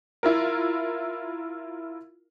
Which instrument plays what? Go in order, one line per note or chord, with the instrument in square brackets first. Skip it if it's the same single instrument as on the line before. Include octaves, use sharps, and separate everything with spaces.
[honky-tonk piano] E4 F4 A#4